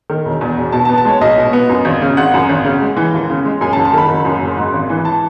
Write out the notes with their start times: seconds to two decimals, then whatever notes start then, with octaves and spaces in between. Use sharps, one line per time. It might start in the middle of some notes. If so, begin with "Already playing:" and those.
0.10 D#3
0.25 E1
0.41 E2
0.57 E1
0.72 B2 A5
0.85 A5
0.89 B3
0.98 A5
1.05 G#3 C#5
1.21 B1 D#5
1.38 B2
1.53 B3
1.69 F#2
1.85 G#1
2.02 C#3
2.17 G#1 F#5
2.34 F#2
2.49 G#1
2.64 C#3
2.82 G#3
2.97 E3
3.14 D#2
3.30 C#3
3.45 G#3
3.61 F#2 G#5
3.73 A5
3.77 F#1
3.85 A5
3.93 D#3 B5
4.09 F#1
4.25 F#2
4.42 F#1
4.57 G#2
4.74 G#1
4.89 E3
5.05 A5